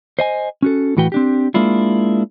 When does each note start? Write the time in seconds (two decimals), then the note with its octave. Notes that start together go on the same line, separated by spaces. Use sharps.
0.19 C5 D#5 G#5
0.62 C#4 F#4 A4
0.97 A2 E3 F#4 B4 G5
1.12 C4 D4 G4
1.54 G#3 A#3 D4 E4 F4